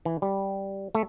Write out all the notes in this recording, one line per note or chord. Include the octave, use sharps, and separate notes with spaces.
E3
G3
A3